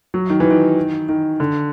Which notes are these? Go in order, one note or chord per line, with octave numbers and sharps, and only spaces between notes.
F#3
D#3
E3
D#3
D#3
D3